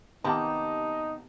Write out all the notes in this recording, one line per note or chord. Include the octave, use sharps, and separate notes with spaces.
C3 D#3 A#3 B3 D#4 G4 A5